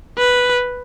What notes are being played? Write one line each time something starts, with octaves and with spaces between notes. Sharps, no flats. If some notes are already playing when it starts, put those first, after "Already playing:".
B4